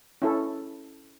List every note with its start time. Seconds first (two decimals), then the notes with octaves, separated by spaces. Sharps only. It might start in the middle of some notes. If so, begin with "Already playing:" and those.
0.22 C#4 E4 A4